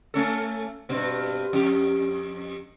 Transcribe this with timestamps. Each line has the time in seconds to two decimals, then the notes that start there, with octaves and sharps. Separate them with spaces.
0.14 A3 C#4 A4
0.89 G2 B2 C4
1.53 F2 G4